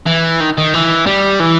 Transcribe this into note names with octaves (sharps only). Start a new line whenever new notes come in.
E3
D#3
D#3
E3
G3
E3